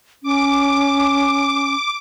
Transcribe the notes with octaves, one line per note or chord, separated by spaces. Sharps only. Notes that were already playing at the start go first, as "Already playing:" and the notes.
C#4 D6